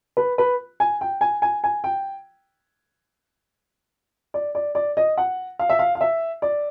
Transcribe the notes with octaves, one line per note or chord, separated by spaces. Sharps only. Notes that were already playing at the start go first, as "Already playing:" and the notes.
B4
B4
G#5
G5
G#5
G#5
G#5
G5
D5
D5
D5
D#5
F#5
F5
E5
F5
F5
E5
D5